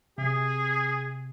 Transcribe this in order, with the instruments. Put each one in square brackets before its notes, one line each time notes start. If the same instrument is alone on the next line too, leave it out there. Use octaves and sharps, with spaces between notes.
[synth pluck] C3 [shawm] G#4